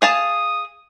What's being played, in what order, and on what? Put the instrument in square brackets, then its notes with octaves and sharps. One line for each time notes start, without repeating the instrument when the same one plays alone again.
[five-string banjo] G#4 F5 A5 [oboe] D#6